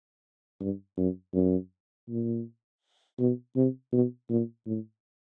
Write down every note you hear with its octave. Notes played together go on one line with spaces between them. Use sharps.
G2
F#2
F#2
A#2
B2
C3
B2
A#2
A2